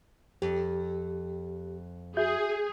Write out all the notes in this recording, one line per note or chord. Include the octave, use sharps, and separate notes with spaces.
F2 G4
F#4 G#4 E5 G6